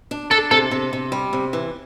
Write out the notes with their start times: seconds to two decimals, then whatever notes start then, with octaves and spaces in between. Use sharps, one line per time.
0.11 D4
0.31 D4 A4
0.51 C3 A4
0.71 C3
0.93 C3
1.12 G3
1.33 C3
1.53 E3